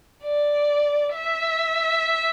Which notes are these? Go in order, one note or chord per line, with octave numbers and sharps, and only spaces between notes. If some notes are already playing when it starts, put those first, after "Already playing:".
D5
E5